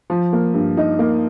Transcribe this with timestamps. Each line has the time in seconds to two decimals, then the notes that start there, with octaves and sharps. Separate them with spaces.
0.10 F3
0.33 A#3
0.54 G2
0.77 D#4
0.99 A#3